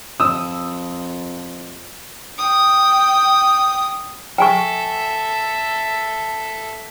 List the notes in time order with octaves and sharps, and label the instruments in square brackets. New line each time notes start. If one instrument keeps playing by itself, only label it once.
[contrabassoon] F2 [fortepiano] D#6 E6
[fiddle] G5 D#6
[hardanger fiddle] A4 E5 [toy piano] G5 G#5 C#6